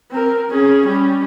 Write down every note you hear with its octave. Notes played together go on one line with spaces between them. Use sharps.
C4 A#4
C#4 G#4
G3 C#4